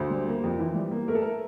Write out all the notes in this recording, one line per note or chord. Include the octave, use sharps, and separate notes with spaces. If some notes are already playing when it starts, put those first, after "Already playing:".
Already playing: D2 C5
G3
A#3
F2
E3
G3
A#3
A3 A#4
A4
A#4